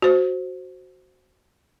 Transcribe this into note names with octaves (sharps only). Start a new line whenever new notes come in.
F#4 C5